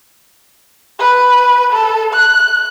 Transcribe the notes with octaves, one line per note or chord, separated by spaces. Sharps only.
B4
A4
F#6